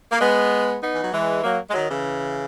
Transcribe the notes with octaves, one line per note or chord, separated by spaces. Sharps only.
A#3
G#3 B3
B3 D#4
E3
F#3
E3 G#3
F#3 A#3
G#3
D#3 F#3
C#3 E3